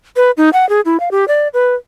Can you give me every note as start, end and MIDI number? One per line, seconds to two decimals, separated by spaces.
0.16 0.31 71
0.37 0.49 63
0.53 0.68 78
0.69 0.81 68
0.85 1.00 64
1.00 1.09 77
1.11 1.25 67
1.28 1.48 74
1.54 1.75 71